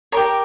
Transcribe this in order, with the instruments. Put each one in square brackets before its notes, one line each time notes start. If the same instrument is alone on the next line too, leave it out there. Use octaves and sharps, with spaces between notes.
[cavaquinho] G4 A#4 C#5 A#5